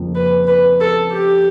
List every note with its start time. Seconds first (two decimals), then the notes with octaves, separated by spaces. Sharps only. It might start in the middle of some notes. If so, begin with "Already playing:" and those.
Already playing: F2 C#3 F3 A#3
0.15 B4
0.48 B4
0.81 A4
1.12 G4